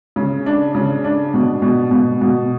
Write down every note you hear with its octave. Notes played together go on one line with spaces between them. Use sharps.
C#3
D4
C#3
D4
B2
B2
B2
B2